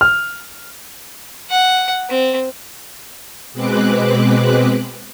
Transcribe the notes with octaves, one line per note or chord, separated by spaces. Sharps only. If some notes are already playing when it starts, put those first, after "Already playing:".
F6
F#5
C4
B2 G#3 C4 B4 D6 F#6